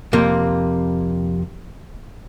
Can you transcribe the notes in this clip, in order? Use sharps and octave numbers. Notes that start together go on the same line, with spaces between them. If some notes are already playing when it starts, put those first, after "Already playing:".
F2 C3 A#3